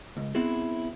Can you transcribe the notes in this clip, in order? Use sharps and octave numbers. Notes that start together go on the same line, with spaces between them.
C#2
B3 C4 E4 F#4 G#4